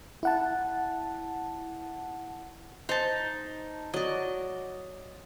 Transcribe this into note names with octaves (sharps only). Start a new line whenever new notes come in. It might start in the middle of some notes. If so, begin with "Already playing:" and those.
E4 F#5 A5
D#4 C5 A5
F#3 D5 D#5